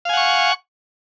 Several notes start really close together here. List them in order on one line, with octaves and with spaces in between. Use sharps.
F5 G#5 F#5 C#6